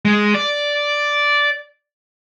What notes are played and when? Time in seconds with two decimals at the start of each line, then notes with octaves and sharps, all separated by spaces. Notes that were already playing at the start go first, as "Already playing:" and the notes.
0.05 G#3
0.34 D5